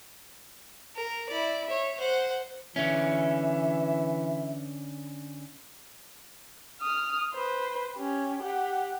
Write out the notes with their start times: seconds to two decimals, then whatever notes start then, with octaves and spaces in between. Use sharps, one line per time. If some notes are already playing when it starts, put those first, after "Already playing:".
0.95 A#4
1.29 E4 D5
1.66 C#5 E5
1.99 C5 F#5
2.76 D3 E3 C#4 E5
6.81 D#6 F6
7.33 B4 C5
7.96 C#4 G4
8.42 G4 F#5